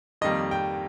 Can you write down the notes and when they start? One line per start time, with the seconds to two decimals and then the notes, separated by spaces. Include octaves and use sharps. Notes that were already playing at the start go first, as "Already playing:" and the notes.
0.21 F2 D#3 G3 A#3 D#5
0.51 G5